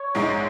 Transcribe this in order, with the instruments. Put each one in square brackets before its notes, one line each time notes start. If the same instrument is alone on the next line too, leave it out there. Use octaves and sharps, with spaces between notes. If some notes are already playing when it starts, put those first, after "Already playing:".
Already playing: [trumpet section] C#5
[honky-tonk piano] A#1 G#2 G#3 D#4